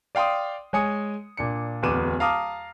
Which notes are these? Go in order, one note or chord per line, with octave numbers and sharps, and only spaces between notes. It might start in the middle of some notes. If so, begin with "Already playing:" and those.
D5 F5 G5 C6 D#6
G#3 C#5 G#5 D#6 C#7
A#2 D4 C#7
D1 E2 B4 D6 D#7 E7
F5 A5 A#5 D6 D#6 F6